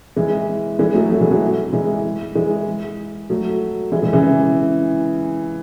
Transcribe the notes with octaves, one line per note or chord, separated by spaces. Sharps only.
E3 G#3
E3 G#3
F#3 A3
F#3 A3
E3 G#3
F#3 A3
E3 G#3
E3 G#3
F#3 A3
E3 G#3
E3 G#3
C#3 E3